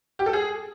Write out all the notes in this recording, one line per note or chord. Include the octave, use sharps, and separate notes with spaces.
G4
A4
G#4